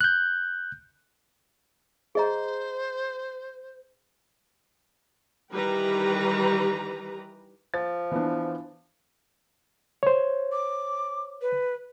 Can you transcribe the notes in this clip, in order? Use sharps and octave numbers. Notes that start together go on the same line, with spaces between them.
F#6 G6
G#4 C5 D#5 A#5
D#3 E3 G3 G4 B4 A#5
F3 A6
E3 B3 D4
C5 C#5
D6
B4